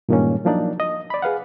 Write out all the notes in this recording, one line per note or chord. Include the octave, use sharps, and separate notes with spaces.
G2 A#2 D#3 G#3 A#3 C#4
F3 F#3 A#3 D4 D#4 D5
D#5
D5 B5
G#4 B4 F5 F#5